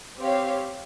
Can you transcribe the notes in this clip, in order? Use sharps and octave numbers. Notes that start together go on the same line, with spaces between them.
C4 G4 C#5 F5